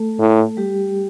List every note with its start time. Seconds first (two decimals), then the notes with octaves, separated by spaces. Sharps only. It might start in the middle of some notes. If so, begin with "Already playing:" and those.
Already playing: A3 A4
0.19 A2
0.57 G3 G4